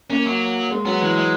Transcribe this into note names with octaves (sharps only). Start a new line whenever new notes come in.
A#3 C#4
F#3
G#3
F#3 B3
E3 G#3
G#3